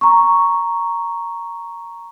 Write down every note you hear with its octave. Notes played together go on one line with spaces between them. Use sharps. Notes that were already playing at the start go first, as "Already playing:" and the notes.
A#5 C#6